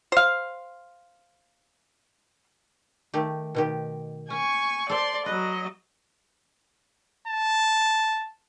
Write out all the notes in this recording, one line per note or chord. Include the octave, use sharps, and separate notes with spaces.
C5 F5
D#3 A3 G4
B2 D#3 G4
C#4 G#5 C#6
A4 C5 D5 C6
F#3 B4 D#5
A5